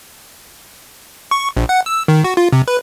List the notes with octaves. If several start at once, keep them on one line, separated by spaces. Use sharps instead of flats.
C#6
A#1
F#5
E6
D#3
F#4
F4
C3
B4